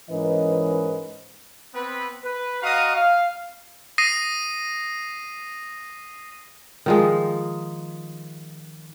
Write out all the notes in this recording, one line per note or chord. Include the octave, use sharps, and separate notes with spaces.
G#2 E3 C#4 A#4 B4 D#5
B3 C4 B4
B4
F#4 D#5 F5 F#5 A#5 D#6
F5
D#6 A#6 C7 D#7
D#3 F3 G#3